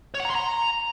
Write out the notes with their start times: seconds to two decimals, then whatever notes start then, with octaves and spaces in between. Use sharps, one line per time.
0.14 C#5
0.20 F#5
0.25 A#5
0.30 C6
0.35 A#5